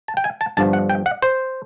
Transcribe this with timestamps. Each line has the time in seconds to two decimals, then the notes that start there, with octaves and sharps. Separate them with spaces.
0.08 A5
0.17 G5
0.24 G#5
0.41 A5
0.57 G1 G2 D3 F3 A5
0.73 F#5
0.90 G5
1.06 F#5
1.22 C5